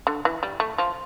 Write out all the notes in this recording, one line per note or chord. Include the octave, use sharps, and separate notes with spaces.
D3
E3
G3
A3
F3